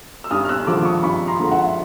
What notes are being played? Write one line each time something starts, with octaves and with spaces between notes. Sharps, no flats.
E6
G2 D#6 F6
F6
E6 F#6
D3 F3 G#3 D6 E6
C#6 D#6
G2 B5 C#6
A#5 C6
D3 F3 G#3
E5 F#5